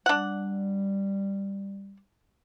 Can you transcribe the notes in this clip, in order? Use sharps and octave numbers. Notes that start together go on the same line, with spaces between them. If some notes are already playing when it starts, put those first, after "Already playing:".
G3 D4 F#5